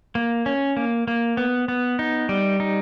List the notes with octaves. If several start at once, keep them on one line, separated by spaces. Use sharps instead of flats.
A#3
C#4
A#3
A#3
B3
B3
D#4
G3
D#4